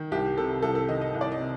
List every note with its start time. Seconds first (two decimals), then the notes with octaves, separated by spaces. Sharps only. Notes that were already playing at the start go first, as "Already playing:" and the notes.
Already playing: D#3
0.11 C2 G4
0.38 C3 A4
0.62 C2 A4
0.75 A4
0.89 D#3 D#5
1.01 D#5
1.14 C2
1.21 D5
1.32 D#5
1.40 C3